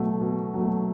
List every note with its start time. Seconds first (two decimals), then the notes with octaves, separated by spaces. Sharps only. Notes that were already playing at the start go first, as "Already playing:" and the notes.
Already playing: B2 F#3 A3
0.21 B2
0.54 F#3
0.59 A3